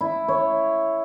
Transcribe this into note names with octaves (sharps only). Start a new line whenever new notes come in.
E4
C#5